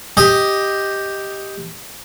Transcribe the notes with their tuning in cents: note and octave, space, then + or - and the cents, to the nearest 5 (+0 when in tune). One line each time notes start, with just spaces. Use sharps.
G4 +0 D#5 +5